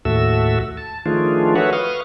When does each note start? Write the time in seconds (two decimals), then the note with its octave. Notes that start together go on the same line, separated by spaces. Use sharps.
0.05 D#2 A2 F#4 A4 E5 E6
0.77 A5
1.06 D#3 F3 A3 D4 F4 G#4
1.55 F#4 A4 B4 C#5 E5 F#5
1.73 B4 F5 C#6 D#6 F6